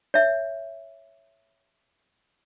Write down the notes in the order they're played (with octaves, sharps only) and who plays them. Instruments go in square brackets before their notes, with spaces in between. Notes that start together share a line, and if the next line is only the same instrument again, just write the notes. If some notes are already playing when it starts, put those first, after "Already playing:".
[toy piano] C#5 E5